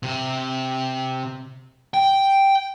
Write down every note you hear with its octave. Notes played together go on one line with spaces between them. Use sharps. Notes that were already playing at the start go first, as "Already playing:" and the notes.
C3
G5